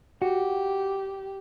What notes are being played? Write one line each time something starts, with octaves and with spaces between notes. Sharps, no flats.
F#4 G4